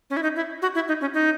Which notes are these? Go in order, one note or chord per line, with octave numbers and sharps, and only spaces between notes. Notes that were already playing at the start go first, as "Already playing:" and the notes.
C#4
E4
D#4
E4
F#4
E4
D#4
C#4
D#4